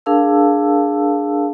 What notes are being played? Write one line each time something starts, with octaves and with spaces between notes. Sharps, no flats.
D4 G#4 A#4 F5 A5 E6